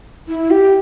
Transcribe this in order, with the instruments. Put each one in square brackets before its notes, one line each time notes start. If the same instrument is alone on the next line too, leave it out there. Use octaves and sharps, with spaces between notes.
[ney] E4
G4